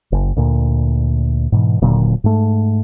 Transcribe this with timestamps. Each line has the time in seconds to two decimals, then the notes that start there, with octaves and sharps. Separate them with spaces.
0.12 F#1
0.37 D2 A#2
1.52 G#2 B2 E3
1.82 D#1 A#2 D3 F#3
2.24 G#2 A3